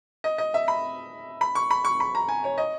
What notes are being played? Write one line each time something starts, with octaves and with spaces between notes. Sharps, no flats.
D#5
D#5
E5
B5
B5
C#6
B5
C#6
B5
A#5
G#5
C#5
D#5